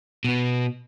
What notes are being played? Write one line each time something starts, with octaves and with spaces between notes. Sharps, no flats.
B2 B3